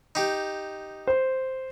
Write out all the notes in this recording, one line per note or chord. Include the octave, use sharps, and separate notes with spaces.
D#4 G4
C5